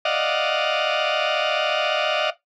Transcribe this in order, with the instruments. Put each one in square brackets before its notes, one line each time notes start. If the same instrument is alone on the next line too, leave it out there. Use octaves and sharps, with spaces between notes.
[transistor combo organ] D5 D#5 F5 F#5